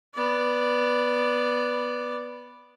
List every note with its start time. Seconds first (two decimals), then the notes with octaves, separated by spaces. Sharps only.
0.14 B3 D5